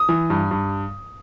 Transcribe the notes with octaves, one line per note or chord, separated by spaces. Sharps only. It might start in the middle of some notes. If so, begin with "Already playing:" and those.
Already playing: D#6
E3
G2
G2